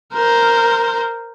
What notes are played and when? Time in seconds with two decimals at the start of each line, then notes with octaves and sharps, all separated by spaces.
0.13 A#4 C5